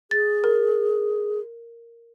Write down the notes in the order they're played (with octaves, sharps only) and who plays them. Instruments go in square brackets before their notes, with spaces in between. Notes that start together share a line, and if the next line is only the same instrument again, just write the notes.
[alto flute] G#4 [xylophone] A6
[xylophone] A#4